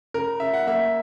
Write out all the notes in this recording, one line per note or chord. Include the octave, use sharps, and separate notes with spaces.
C#3 A#4
C#3 E5
F#5
A#3 E5